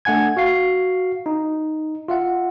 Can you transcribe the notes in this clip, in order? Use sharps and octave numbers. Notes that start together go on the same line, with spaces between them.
A3 D4 F#5 G#5 G#6
F#4 F5 C7
D#4
F4 E5 F#5